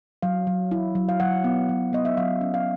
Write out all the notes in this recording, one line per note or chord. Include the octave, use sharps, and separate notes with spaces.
F#3 F5
F#3
E4
F#3
F5
F#3 F#5
B3
F#3
B3 D#5
E5
F#3 F5
C#4
F5